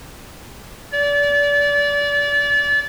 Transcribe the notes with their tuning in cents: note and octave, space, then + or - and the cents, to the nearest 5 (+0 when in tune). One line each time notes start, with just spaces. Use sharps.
D5 -30